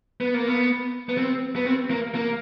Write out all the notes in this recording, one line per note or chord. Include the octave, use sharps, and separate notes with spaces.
B3
A#3
B3
B3
C4
B3
C4
A#3
A#3